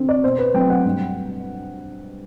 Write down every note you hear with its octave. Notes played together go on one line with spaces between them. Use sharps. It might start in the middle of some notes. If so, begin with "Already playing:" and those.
Already playing: D3 C4
D5
B2 C5
B4
F#3 A3 C4 G5
F#5
G2